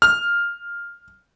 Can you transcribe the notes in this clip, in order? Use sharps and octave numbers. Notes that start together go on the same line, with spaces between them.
F6